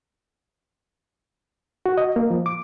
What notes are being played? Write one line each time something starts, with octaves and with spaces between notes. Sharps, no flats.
F#4
D#5
A#3
F3
D6